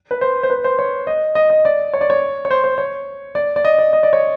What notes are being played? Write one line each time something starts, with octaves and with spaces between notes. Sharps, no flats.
B4
C5
C5
B4
C5
C#5
D#5
D#5
D#5
D5
C#5
D5
C#5
C#5
C5
C5
C#5
D5
D5
D#5
D5
D#5
D5
C#5